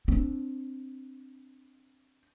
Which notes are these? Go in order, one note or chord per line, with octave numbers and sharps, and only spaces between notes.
C4 D4